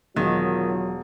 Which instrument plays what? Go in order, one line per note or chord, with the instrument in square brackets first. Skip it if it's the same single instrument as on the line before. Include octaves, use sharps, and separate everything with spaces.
[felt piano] E1 [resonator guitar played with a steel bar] D#3 [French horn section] F#3 F4